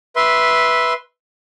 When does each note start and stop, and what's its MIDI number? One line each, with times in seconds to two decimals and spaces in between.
0.16 0.93 71
0.16 0.93 76
0.16 0.93 84